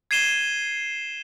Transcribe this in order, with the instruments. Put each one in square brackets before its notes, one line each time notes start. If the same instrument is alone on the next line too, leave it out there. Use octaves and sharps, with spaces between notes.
[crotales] G#6 C7 D#7 E7 G7